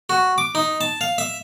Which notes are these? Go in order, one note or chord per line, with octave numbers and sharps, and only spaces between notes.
F#4
D6
D#4
A5
F5
E5